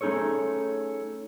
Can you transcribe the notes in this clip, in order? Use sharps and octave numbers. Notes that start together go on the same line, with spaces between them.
A3 C#4 D#4 G#4 A4 C#5